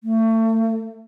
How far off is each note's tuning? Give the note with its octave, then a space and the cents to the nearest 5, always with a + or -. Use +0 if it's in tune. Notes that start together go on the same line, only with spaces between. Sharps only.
A3 +30